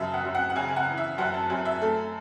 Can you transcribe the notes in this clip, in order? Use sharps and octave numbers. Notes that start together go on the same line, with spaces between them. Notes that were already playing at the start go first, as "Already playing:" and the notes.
Already playing: F#2 C#3 E5 A5
F#5
F#2
F#5
F#5
C#3 G#5
G#5
F#5
E3
E5
F#2 F#5
A5
F#2 G#5
E5
A3 A4